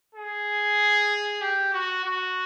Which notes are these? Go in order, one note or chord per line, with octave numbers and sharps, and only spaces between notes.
G#4
G4
F#4
F#4